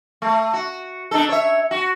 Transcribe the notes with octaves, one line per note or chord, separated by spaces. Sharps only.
A3
F#4
D4 D#4 A4
C#5 E5
F#4